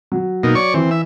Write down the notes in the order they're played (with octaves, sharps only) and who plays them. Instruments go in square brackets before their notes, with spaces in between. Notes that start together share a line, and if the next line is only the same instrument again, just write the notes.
[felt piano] F#3
[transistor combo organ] B2 A#3 D#4
C#5 D5 C#6
[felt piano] E3 [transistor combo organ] C4
[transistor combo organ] E5